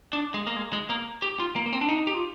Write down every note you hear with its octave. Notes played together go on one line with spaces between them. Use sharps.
D4
G#3
A#3
G#3
G#3
A#3
G4
F4
A#3
A#3
C4
D4
D#4
G4
F4